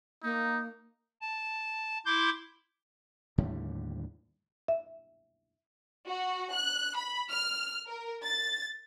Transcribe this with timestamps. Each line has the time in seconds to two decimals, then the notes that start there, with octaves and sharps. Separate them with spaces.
0.23 A#3 D#4
1.21 A5
2.06 E4 C6 D6 G6
3.38 D#2 A2 D3 G3
4.68 E5
6.08 F#4
6.53 F#6
6.97 B5
7.30 F6
7.87 A#4
8.23 A6